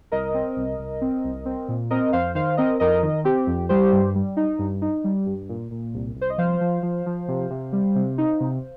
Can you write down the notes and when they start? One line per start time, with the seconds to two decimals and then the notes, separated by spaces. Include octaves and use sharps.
0.12 C2 A#4 D#5
0.34 C4
0.57 C2
0.78 C2
1.01 C4
1.24 C2
1.45 C4
1.68 A#2
1.91 C4 A#4 D#5
2.13 F2 C5 F5
2.35 D#3 C5 F5
2.57 C4 A#4 D#5
2.80 F2 A#4 D#5
3.03 D#3
3.24 C4 G4
3.47 F2
3.69 G3 G4 C5
3.92 G2
4.15 G3
4.37 D#4
4.59 G2
4.82 D#4
5.04 G3
5.26 G2
5.49 A#2
5.71 A#2
5.94 C2
6.16 C2
6.21 C5
6.30 D#5
6.38 F3 C5 F5
6.61 F3
6.83 F3
7.06 F3
7.28 C3
7.50 C3
7.72 G3
7.95 C3
8.18 D#4
8.40 C3